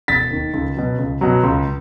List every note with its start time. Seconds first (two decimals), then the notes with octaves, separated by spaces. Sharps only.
0.08 E1 A6 B6
0.31 D#2 D#3
0.54 C#2
0.76 B2 F#3
0.99 C#2
1.21 B2 F#3
1.44 C#2